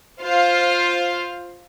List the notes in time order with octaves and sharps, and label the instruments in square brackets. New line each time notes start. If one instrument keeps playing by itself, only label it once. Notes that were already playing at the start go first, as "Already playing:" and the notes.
[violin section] F4 C5 F5